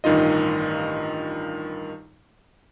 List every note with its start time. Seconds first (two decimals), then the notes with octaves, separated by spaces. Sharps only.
0.04 A1 G2 D#3 D#4 F4 D#5